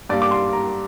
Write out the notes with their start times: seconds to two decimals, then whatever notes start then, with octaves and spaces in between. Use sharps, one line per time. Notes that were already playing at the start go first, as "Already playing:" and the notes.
0.09 G2 G3 A#3 D5
0.22 D6
0.31 C6
0.53 A#5